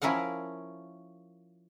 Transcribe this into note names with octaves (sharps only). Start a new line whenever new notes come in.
F3 C#4 E4 A#4 F5 F#5